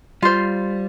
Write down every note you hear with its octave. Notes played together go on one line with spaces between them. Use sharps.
G3 F4 C5